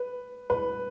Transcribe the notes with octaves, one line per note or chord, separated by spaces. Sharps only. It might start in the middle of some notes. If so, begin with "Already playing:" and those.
Already playing: B4
B4